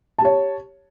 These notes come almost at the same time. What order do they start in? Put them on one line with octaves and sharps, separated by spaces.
A5 G4 C#5